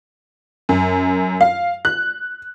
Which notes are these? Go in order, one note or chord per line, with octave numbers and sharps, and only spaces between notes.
F#2
F5
F#6